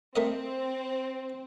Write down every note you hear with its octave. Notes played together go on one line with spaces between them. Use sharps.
A3 C4 A#4 D#5